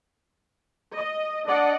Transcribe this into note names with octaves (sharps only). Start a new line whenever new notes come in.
D#5
D4 D5 D#5 F#5